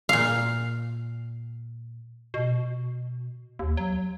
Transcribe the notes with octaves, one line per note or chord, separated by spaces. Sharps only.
A#2 F5
B2
D#2
F#3